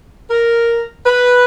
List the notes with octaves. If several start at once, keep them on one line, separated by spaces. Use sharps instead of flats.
A#4
B4